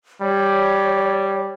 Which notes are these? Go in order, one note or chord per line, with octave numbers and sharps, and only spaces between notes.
G3 C#5